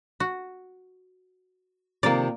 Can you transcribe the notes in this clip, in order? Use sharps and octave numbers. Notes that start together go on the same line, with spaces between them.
F#4
C3 D#3 F3 A#3 D5